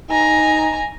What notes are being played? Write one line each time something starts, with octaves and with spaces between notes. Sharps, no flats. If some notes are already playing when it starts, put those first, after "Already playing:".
D#4 G#5 A#5